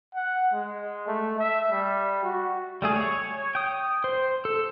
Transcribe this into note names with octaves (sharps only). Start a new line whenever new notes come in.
F#5
G#3
A3
E5
G3
F#4
G3 A3 G#4
C#5
G5 D#6
C5
A4